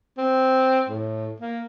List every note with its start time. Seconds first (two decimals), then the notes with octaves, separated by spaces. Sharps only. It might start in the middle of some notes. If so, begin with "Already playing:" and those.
0.18 C4
0.88 A2
1.40 A#3